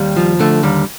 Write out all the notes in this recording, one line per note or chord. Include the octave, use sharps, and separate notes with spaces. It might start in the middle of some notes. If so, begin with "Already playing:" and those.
Already playing: D#2 G3
F3
D3 A3
D#2 G3